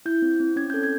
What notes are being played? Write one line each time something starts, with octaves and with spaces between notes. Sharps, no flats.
E4 G6
C4
C4
C#4 G#6
A4 G6
G#6